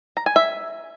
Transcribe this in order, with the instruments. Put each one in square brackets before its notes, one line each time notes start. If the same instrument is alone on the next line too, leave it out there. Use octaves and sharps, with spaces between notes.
[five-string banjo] A#5
G#5
E5